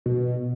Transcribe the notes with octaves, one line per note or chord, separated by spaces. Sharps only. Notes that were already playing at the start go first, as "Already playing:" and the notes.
B2